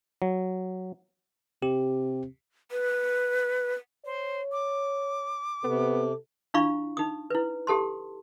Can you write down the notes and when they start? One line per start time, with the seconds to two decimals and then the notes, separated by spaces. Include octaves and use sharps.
0.22 F#3
1.62 C3 G4
2.71 B4
4.05 C5 C#5
4.52 D6
5.64 C3 B3 A4
6.54 D4 E4 F4 F5 B5 C#6
6.97 D#4 D#6
7.30 E4 B4
7.67 G4 A4 A5 C6